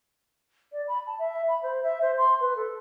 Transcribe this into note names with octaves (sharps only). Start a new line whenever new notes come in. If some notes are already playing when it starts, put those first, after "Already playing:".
D5
B5
A5
E5
B5
C5
E5
C5
C6
B4
A4